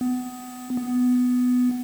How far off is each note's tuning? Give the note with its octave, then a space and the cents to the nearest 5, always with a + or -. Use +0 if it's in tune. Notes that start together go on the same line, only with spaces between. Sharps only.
B3 +25
B3 +10